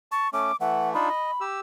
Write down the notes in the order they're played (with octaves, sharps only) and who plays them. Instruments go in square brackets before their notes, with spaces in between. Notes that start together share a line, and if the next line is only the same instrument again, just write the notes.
[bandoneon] A5 [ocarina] C#6
[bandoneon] A3 C#4 [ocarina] D6
[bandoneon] E3 A3 [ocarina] F#5
[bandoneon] D4 D#4 F4 [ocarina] B5
[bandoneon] D#5
G4 E6